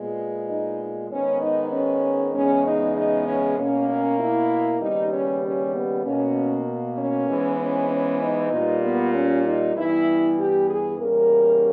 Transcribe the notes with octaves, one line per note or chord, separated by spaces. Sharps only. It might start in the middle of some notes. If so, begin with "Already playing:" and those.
Already playing: A#2 G#3 B3
D#4
G#2 D#3 G#3 B3 C#4
D#4
C#4
E2 C#3 G#3 B3 C#4
D#4
D#4
C#4
B2 A#3 C#4
C#4
E4
D#2 C#3 G3 B3 D#4
C#4
C#4
B3
B2 A#3 C#4
C#4
G#2 E3 G#3 B3
C#4
C#4
D#4
A#2 G3 B3
B3
C#4
D#4
G2 E3 G3 B3 E4
G4
G#4
E2 C#3 G3 A#3 A#4